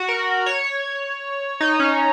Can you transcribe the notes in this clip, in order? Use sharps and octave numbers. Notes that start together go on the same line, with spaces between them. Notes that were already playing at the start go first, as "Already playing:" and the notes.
Already playing: F#4
A#4
C#5
D#4
C#4